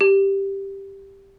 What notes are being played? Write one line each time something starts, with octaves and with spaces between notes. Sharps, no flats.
G4